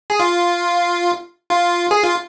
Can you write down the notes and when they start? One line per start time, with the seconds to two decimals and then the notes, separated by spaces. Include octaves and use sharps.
0.10 G#4
0.20 F4
1.50 F4
1.91 G#4
2.02 F4